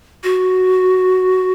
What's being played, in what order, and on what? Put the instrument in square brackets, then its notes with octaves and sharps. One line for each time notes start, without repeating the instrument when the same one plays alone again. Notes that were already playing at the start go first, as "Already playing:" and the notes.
[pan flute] F#4